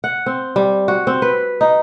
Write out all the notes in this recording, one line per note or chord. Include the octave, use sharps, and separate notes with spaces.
F#5
C4
G3
F#4
C4
B4
D#4